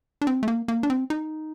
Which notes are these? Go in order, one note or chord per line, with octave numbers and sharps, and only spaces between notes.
D4
C4
A3
A#3
A#3
D4
C4
D#4